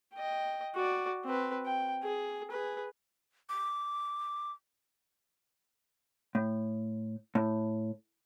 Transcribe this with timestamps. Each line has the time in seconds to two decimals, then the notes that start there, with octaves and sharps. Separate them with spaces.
0.14 D#5 G5
0.75 F#4 D5
1.25 C4 B4
1.66 G5
2.03 G#4
2.51 G#4 B4
3.49 D6
6.35 A2
7.35 A2